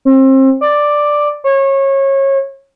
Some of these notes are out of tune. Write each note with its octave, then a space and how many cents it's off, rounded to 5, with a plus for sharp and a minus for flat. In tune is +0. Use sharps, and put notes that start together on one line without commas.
C4 +30
D5 +5
C#5 -25